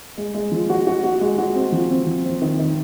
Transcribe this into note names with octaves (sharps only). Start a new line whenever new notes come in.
G#3
G#3
F3
F#4
F#4
F#4
G#3
F#4
C4
F3
C4
F3
C4
D#3
D#3